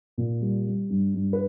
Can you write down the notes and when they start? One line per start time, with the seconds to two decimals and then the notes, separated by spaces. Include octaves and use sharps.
0.18 A#2
0.41 G3
0.66 G3
0.90 G2
1.14 G2
1.33 B4